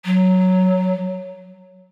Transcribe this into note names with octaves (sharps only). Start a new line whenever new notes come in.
F#3